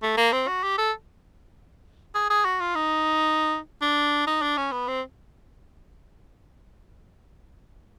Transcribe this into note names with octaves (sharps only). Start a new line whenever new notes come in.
A3
A#3
C4
F#4
G4
A4
G#4
G#4
F#4
F4
D#4
D4
D#4
D4
C#4
B3
C4